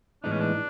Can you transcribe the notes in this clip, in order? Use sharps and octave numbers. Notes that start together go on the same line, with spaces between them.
A2 E3 G#3 B3 D4 D#4
C#4
D4